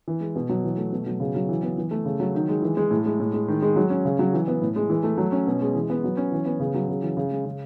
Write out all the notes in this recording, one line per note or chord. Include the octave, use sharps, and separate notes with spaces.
E3
G#3
B2
F#3
E3
A3
B2
F#3
C#3
F#3
E3
B3
E3
A3
C#3
F#3
D#3
G#3
E3
G#3
A2
G#3
A2
G#3
D#3
G#3
F#3
C#4
C#3
F#3
E3
B3
A2
G#3
E3
A3
F#3
C#4
B2
G#3
E3
B3
F#3
C#4
E3
B3
C#3
F#3
C#3
E3
C#3
G#3
C#3